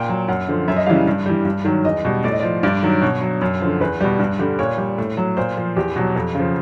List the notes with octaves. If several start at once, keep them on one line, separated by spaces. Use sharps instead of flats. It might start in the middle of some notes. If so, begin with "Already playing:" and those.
Already playing: A#2 G5
F#3
F#2 F#5
D3 F3
F#2 E5
D#5
C#3 E3 G3 F5
G2
E3 G3
G2
D#3 F#3
E2 D#5
B2 G3
A2 D5
D#5
F3 D5
G2 D5
D#3 F#3
B2 C#5
F#3
F#2
D3 F3
E2 B4
B2 G3
G2
D3 G3
A#2 C#5
G3
A2
F#3
A#2 C5
F3
E2 G4
B2 F#3
F2
C#3 F3